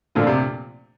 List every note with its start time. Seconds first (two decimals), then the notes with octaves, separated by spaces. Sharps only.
0.15 A#2 D3 F3 A3 D4 F4
0.27 C3